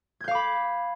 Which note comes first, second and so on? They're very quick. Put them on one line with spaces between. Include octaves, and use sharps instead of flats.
G#6 G6 F5 D6 B5